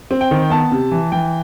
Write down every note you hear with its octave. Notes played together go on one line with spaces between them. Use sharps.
C4
G5
D#3
B3 A5
C3
E3
E3 G5